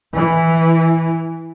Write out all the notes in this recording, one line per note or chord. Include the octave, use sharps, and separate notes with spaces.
E3